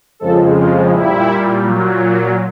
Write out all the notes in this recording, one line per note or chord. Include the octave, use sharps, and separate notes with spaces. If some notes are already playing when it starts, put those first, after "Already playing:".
F2 C#3 F3 G#3 A4
F4
A#2 G3 E4
A#2 F#3